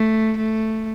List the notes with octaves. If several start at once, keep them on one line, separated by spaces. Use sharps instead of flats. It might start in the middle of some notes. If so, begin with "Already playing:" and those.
Already playing: A3
A3